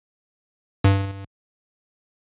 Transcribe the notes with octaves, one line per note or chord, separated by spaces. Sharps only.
G2